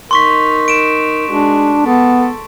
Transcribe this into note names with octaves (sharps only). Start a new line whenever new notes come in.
D#4 A#4 C6 C#6 B6
D7 E7
G#3 D4 F#4
B3 A4